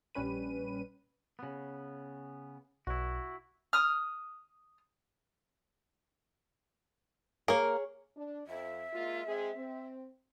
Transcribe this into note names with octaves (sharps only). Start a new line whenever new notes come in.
A#1 G3 C#4 B4 D#7
C#3 B3
B1 E4 F#4
D#6 F6
A#3 G#4 A#4 C#5
D4
F2 E5
G#3 A#3 F4
G#3 C4 G#4
C4